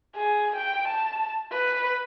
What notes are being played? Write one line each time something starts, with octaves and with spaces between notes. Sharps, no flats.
G#4
G5
A5
B4